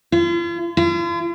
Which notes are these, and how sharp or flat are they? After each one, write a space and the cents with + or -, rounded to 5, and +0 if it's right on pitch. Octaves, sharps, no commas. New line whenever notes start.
F4 -40
F4 -45